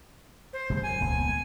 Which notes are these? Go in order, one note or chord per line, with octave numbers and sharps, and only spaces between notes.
C5
F#1 C3 G#3
F#2 G#5
D#1 C#2 B3